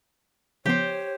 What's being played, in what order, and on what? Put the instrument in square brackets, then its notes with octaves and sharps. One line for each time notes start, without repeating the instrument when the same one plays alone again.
[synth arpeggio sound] C#3 F3 B3 [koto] G4 C5 [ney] C#5